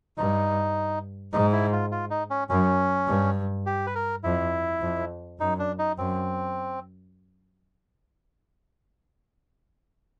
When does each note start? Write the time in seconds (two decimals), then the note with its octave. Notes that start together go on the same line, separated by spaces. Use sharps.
0.17 G2 D#4
1.33 G#2 D#4
1.53 E4
1.72 F4
1.92 F4
2.10 D#4
2.30 C#4
2.49 F#2 C#4
3.07 G2
3.66 G4
3.87 B4
3.95 A#4
4.24 F2 E4
4.81 F2
5.40 F#2 D#4
5.59 D4
5.79 D#4
5.98 F#2 C4